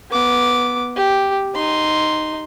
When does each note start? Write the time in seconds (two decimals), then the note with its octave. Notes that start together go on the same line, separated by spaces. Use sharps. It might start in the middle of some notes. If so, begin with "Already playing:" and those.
0.11 B3 D6
0.96 G4
1.55 D#4 C6